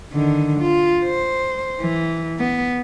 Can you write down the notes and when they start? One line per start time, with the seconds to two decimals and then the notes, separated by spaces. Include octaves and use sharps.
0.13 D3 D#3
0.61 F4
1.04 C5
1.81 E3
2.39 B3